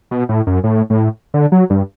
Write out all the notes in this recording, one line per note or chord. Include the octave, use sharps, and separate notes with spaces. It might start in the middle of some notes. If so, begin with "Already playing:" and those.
B2
A2
F#2
A2
A2
D3
F#3
G2